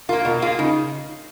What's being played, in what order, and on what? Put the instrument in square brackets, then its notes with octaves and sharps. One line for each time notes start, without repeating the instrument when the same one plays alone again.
[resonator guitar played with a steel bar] A#3 F4 [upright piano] A#4
[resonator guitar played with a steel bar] B2 [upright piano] A#4
[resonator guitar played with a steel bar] A#3 F4 [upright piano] G#4
[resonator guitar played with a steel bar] C#3 [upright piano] D#4